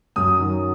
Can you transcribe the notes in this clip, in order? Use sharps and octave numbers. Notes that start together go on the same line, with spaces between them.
F#2 D#6
D#3 F#3